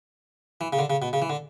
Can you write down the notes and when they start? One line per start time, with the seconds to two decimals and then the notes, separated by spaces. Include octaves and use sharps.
0.61 E3
0.73 C#3
0.79 D3
0.90 C#3
1.02 B2
1.13 C#3
1.22 E3
1.30 D3